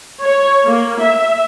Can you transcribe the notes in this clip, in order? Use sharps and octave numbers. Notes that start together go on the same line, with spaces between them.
C#5
A#3
E5